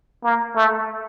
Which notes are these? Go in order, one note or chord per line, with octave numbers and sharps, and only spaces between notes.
A#3
A3